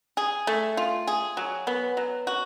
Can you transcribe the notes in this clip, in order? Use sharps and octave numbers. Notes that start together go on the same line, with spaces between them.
G#4
A3
F4
G#4
F#3
B3
F#3
F#4